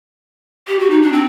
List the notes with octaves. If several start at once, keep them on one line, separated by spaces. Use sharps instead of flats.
G4
F#4
D#4
D4
C4